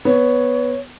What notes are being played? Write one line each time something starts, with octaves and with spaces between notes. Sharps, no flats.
B3 C#5